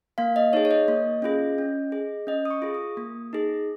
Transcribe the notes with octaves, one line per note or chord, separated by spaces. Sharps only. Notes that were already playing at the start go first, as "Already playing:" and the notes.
A#3 F5
D#5
D#4 G#4 C#5
C#5
D#5
A#3
C#4 F4 G#4
C#4
G#4
C#4 D#5
D#6
C#6
F4 G#4
D#6
A#3
D#4 G#4